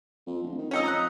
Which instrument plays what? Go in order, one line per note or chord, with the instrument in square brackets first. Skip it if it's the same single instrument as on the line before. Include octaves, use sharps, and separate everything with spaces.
[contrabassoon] F2
D1
D#3
[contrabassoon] F2 [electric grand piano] C#4 D#4 D#5 [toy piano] F5 G5 E6
[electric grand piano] A#5 D#6 F#6